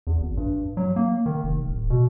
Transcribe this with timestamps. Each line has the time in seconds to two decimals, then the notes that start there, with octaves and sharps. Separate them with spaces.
0.07 E2
0.20 G#1
0.37 G2
0.77 F#3
0.96 A#3
1.26 D#3
1.44 F1
1.68 D1
1.90 B2